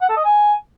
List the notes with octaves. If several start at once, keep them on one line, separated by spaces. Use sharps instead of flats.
F#5
A4
D#5
G#5